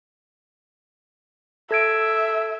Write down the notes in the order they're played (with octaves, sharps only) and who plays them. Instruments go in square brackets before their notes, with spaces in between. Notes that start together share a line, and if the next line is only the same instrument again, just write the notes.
[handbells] A4 G#6 D7 [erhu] E5